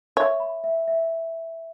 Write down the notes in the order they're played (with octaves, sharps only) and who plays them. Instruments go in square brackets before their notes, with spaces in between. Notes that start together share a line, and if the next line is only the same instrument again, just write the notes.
[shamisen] C#5 [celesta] E5
[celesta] B5
E5
E5